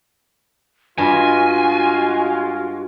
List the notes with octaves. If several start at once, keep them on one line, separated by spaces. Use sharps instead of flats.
G2 G#3 F4 F#4 G#5